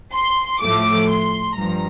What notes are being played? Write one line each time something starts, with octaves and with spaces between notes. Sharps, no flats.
C6
A2 F3 A3 D6
C6
G2 F3 A#5